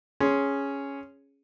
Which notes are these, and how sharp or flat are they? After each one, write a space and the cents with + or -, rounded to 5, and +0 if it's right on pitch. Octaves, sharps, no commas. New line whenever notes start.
C#4 +0 G#4 +0 C6 +0